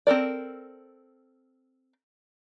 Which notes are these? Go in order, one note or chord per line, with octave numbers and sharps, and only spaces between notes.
C4 A4 A#4 D5